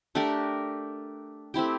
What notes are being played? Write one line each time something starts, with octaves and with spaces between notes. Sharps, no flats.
A3 D4 G4 A#4
A3 C4 E4 G4